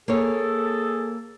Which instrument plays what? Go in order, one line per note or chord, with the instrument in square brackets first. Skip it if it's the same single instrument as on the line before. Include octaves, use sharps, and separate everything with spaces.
[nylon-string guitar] A#3 C#5 [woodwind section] G#4 A4